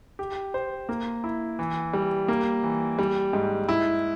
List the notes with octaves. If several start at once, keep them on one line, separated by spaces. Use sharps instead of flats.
G4
C5
A#3
E4
E3
G3
A#3
E3
G3
G#2
E4